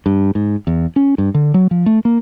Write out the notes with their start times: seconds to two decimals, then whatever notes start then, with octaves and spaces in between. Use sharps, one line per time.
0.06 G2
0.35 G#2
0.67 E2
0.96 C#4
1.18 G2
1.34 D3
1.54 F#3
1.71 F3
1.86 A3
2.05 A#3